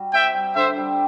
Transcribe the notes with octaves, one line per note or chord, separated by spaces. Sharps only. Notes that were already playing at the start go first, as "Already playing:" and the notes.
Already playing: G3 F#4
C4 E5 G5
G3
D3 C5 E5
G3